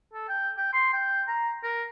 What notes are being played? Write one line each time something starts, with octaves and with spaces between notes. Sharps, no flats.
A4
G5
G5
C6
G5
A#5
A#4